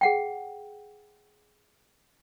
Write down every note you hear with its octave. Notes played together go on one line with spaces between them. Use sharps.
G#4 F#5 G5